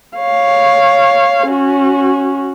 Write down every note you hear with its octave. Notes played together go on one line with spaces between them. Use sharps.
C#5 F5
C#4 F#4